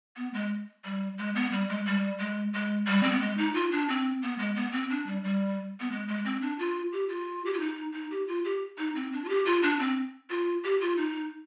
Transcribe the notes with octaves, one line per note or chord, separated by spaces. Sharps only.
B3
G#3
G3
G#3
B3
G3
G#3
G3
G#3
G#3
G3
C4
B3
G#3
D#4
F4
D4
C4
B3
G#3
B3
C4
D4
G3
G3
B3
G#3
G#3
C4
D4
F4
G4
F4
G4
F4
D#4
D#4
G4
F4
G4
D#4
C4
D4
F4
G4
F4
D4
C4
F4
G4
F4
D#4